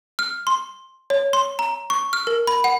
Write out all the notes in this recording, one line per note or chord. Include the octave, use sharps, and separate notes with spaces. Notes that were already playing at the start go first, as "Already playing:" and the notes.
F6
C6
C#5
C6
A#5
C#6
F6
A#4
B5
F#5